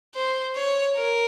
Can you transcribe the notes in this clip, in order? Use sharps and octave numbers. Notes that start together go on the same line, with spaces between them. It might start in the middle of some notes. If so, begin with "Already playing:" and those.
C5
C#5
A#4